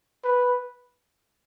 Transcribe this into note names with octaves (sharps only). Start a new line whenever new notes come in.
B4